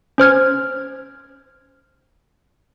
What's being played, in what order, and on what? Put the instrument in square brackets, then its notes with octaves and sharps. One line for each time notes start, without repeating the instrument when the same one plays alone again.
[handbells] C#4 C5 F6 G#6